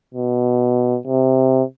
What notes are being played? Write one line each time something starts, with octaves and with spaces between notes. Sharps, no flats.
B2
C3